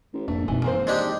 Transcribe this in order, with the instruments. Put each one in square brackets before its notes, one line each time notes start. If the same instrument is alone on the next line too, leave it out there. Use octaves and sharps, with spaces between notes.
[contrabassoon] A1
[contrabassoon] A#1 [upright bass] F2 G#2 [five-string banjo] A3
[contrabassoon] G#1 [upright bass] F#2 B2 [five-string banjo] E3
[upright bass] E3 C#4 [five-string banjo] A#3 C4 C5
[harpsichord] G#3 D4 G4